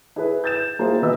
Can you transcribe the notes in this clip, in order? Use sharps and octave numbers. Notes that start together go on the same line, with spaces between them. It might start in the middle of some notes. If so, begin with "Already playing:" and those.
E4 G#4 B4
G6 A6 E7
A#3 E4 F4 G4 G#4 C5
B2 E3 B3 B4 D#5 E6